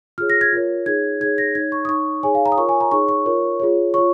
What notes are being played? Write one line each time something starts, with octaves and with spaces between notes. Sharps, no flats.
F4 G#4 C#5 F6
A#6
G#6
F4 A#4 C#5
D#4 G#4 C#5 G#6
D#4 G#4 C#5 G#6
A#6
D#4 C#5 G#6
C#6
D#6
D#4 C#5 C#6
D#4 G#4 C#5 G#5
F5
A#5
D#6
F4 A#4 C#5 C#6
G#5
A#5
D#4 G#4 C#5 C#6
C#6
F4 A#4 C#5
F4 G#4 C#5
F4 C#5 C#6